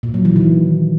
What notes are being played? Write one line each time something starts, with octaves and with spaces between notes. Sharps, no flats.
A#2
F#3
E3
D#3